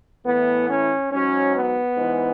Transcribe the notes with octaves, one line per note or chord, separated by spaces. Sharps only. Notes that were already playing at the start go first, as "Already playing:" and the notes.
A2 E3 B3
C#4
G#2 F#3 C#4
B3
G#2 E3